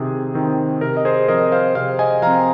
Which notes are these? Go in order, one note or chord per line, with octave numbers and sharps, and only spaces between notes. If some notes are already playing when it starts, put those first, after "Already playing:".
Already playing: C3 D#3 C4 G#4
D#3 C4
C3 A#4
D#5
G#4 C5
F3 C4 A#4 D#5
C5 F5
C3 C5 F5
D#5 G#5
F3 C4 F5 A#5